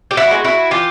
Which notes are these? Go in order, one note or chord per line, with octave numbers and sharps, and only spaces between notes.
G4
E4 F#4
G#3 B3
E4 F#4
E3 F4 G4